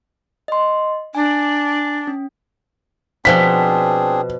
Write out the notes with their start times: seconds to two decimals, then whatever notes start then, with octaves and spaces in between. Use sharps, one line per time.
0.48 D#5 C6
1.15 D4 G#5
2.07 C#4
3.25 B2 F3 C4 D4 G#4 F#5 B6